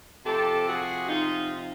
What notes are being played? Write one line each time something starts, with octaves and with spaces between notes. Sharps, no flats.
C3 F3 G4 A4
F#4 G#4
D#4 F4